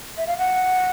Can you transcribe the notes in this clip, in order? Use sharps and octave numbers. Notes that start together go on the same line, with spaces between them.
E5
F5
F#5